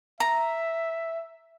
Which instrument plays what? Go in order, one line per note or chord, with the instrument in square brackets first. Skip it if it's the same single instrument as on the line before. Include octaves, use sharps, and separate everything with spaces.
[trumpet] E5 [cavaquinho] A#5